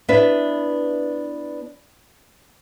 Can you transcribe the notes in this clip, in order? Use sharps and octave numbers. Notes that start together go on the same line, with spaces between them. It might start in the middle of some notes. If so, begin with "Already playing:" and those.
B3 D4 E4 B4 E5